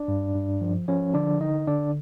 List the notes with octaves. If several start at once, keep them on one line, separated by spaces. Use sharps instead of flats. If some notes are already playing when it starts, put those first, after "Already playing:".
Already playing: D4 D5
G2
G2
F3
F3 C#4 C#5
D3 D4 D5
D3 D#4 D#5
D3 D4 D5